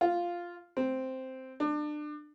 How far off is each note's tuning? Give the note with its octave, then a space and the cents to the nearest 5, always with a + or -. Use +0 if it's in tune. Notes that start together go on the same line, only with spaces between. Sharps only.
F4 +0
C4 +0
D4 +30